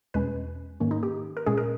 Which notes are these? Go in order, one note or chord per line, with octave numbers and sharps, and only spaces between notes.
E2 B2 G#3 C#4 B4
G#2 D#3 A#3 C#4
D#4
G4
A#4
A#2 G#3 C#4 G#4
A#4